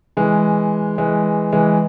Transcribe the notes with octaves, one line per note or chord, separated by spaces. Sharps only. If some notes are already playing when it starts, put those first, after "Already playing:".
E3 G#3
E3 G#3
E3 G#3